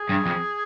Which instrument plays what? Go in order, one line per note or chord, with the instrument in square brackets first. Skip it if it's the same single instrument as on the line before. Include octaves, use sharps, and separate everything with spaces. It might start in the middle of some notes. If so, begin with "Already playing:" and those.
Already playing: [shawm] G#4
[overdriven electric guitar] G2
F2